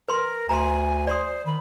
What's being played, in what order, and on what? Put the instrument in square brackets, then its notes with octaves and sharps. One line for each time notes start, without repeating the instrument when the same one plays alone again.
[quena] A#4 [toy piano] B4 C6
[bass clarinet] D2 [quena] G#5 [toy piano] A#5 C6
[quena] C5 [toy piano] D5 C6 D#6
[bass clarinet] D#3 [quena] B5